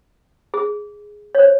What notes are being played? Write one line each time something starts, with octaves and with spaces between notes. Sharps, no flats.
G#4
C#5
C5